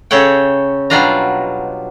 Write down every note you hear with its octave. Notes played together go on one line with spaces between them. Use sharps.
C#3 A4 C#5 F#5 G5
B2 F#3 G3 D4 F4 A#5